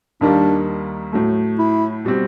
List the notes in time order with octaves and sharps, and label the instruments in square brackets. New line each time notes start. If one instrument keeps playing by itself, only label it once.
[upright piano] D#2 D#3 G3 A#3 [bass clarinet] D4
[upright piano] A2 F#3 A3
[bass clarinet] E4
[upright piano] B2 G3 C4